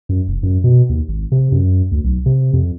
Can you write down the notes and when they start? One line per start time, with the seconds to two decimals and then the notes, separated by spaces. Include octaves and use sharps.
0.09 F#2
0.28 F1
0.43 F#2
0.64 B2
0.89 D#2
1.09 G#1
1.32 C3
1.52 F#2
1.92 D2
2.04 B1
2.26 C3
2.53 F2